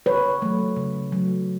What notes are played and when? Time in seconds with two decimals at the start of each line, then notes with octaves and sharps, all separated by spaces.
0.06 C#3 B4 C#5
0.42 F#3 A3
0.76 C#3
1.12 F#3 A3